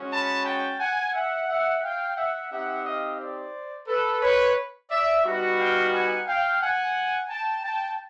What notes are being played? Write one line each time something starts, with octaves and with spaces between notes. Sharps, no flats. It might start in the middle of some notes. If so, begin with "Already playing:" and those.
Already playing: G#3 C#4 F#4
A5 B5
G5 A5
F#5 G#5
E5 F#5
E5 F#5
F5 G5
E5 F#5
C4 D#4 G4 E5 F#5
D#5 F5
C5 D5
A4 B4
B4 C#5
D5 E5
G3 B3 D#4 F#4
F5 G5
F#5 G#5
F5 G5
F#5 G#5
G5 A5
G5 A5